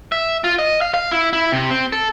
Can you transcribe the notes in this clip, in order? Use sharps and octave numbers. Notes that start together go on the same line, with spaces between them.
E5
F4
D#5
F5
F5
E4
E4
C3
C4
A4